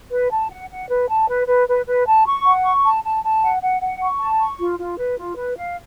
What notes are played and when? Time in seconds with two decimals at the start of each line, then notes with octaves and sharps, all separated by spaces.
0.11 B4
0.31 A5
0.50 F#5
0.69 F#5
0.89 B4
1.08 A5
1.28 B4
1.47 B4
1.68 B4
1.86 B4
2.06 A5
2.26 C#6
2.45 F#5
2.64 C#6
2.84 A5
3.03 A5
3.24 A5
3.42 F#5
3.62 F#5
3.82 F#5
4.01 C#6
4.20 A5
4.40 C#6
4.60 F4
4.79 F4
4.98 B4
5.18 F4
5.37 B4
5.57 F5